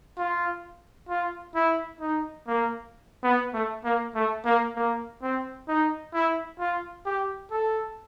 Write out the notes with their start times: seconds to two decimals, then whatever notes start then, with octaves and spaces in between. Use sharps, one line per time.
0.18 F4
1.09 F4
1.55 E4
2.01 D#4
2.48 A#3
3.24 B3
3.54 A3
3.84 A#3
4.15 A3
4.46 A#3
4.76 A#3
5.23 C4
5.68 D#4
6.14 E4
6.59 F4
7.06 G4
7.51 A4